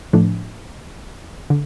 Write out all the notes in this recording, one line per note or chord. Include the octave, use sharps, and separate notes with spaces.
A2 F3 A3 D4
D3